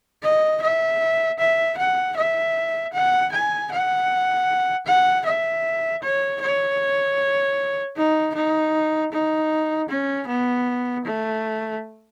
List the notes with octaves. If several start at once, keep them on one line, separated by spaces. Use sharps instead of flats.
D#5
E5
E5
F#5
E5
F#5
G#5
F#5
F#5
E5
C#5
C#5
D#4
D#4
D#4
C#4
B3
A3